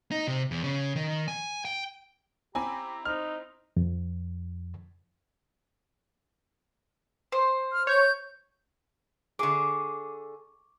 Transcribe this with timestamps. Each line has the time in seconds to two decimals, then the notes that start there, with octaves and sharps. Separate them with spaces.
0.11 D#4
0.28 C3
0.51 E2
0.64 C#3
0.96 D#3
1.28 G#5
1.65 G5
2.55 C4 E4 G4 G#5 A#5 B5
3.05 D#4 C5 F6
3.77 F2
7.32 C5
7.72 F6
7.87 C#5 G6
9.39 D3 G#4 C#6 D6